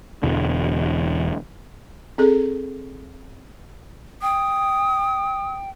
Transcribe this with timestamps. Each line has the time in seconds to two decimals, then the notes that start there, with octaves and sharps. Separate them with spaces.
0.23 E1 E2 D3
2.18 C4 G#4 A4
4.22 G5 D#6